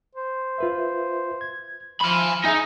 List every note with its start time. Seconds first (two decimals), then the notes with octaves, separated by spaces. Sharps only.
0.15 C5
0.58 F4 B4 E5
1.41 G#6
2.01 F3 G#5 B5 C6 F6
2.45 D#4 G#4 E5 G#5